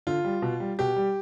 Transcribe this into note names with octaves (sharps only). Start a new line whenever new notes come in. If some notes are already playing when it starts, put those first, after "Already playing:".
D3 F4
G3
B2
G3
B2 G4
G3